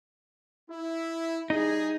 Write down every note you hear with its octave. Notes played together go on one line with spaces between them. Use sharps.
E4
G3 D#4 G#4